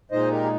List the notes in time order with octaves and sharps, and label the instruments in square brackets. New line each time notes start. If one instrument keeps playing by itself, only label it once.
[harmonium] A#2 G#3 D#4 C5 D#5
G4 A#4
G#4